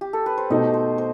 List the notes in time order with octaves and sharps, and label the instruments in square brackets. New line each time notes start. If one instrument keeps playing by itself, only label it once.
[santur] G4
A4
B4
C5
[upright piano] B2 A3 D#4 [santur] D#5
[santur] C5
C5